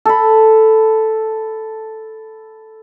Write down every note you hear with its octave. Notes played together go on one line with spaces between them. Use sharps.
A4 B5